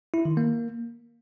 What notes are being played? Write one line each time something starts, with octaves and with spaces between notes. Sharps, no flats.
E4
D#3
A#3